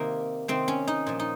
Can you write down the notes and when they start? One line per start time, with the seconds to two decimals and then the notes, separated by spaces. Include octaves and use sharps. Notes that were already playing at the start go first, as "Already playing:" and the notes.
Already playing: C3 D#3 A#3
0.48 C3 D#3 C4
0.68 C#4
0.88 D#4
1.07 A#2 F3
1.20 D#4